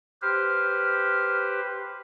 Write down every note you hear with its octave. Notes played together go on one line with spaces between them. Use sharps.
G4 B4 C5 F6